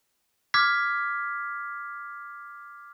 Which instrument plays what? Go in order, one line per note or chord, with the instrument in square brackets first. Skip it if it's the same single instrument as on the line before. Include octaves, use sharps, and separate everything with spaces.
[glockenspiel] D6 F6 G#6 B6